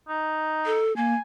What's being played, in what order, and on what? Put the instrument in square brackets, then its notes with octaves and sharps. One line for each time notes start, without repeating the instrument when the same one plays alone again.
[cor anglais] D#4
[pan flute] A4
[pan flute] A#3 [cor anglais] G#5